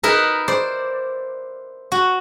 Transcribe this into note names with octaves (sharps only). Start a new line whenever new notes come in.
D#4 E4 A#4 B4
C5 D5
F#4